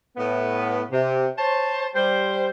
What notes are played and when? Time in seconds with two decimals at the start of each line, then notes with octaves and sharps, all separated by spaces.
0.17 A2 B3
0.91 C3
1.38 C5 C#5 A5
1.94 G3 C5